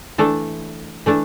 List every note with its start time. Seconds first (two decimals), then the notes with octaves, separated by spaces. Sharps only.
0.18 E3 A3 D4 A4
1.06 E3 A3 D4